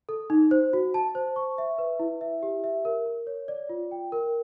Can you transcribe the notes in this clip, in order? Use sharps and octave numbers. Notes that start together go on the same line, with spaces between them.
A4
D#4
C5
F#4
A5
C5
C#6
E5
B4
E4
E5
G4
E5
A#4
A#4
C#5
D5
F4
G5
A#4